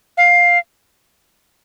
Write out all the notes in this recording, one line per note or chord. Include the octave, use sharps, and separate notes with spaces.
F5